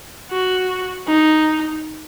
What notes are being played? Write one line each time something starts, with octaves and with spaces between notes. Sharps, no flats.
F#4
D#4